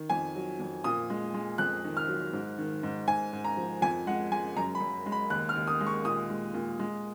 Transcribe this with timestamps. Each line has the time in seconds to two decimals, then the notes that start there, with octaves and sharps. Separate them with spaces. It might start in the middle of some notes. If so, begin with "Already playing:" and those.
Already playing: D#3
0.10 F2 G#5
0.35 F#3
0.60 F2
0.84 A#2 D#6
1.10 G#3
1.34 G#3
1.58 F2 F#6
1.84 D#3
1.97 F6
2.08 F#3
2.33 G#2
2.58 D#3
2.83 G#2
3.08 G#2 G#5
3.33 G#2
3.45 A#5
3.57 F3
3.82 F2 G#5
4.07 G#3 F#5
4.32 G#3 G#5
4.57 F#2 A#5
4.75 B5
4.80 F#2
5.06 G#3
5.12 B5
5.30 D#2 F#6
5.49 F6
5.56 D#2
5.68 D#6
5.80 G#3
5.87 C#6
6.05 A#2 D#6
6.30 G#3
6.54 A#2
6.79 G#3